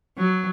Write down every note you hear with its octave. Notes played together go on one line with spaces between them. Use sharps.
F#3